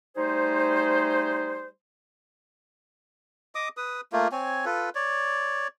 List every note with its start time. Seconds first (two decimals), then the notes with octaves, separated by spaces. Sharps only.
0.17 G3 A3 D#4 G#4 C5
3.55 D#5 D6 D#6
3.77 B4 D#6
4.12 A3 A#3 F4
4.32 C4 C#5 G#5
4.65 F4 A4 B4
4.95 C#5 D5